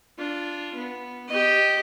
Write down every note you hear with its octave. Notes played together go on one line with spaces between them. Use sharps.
D4 F4
B3
G4 D#5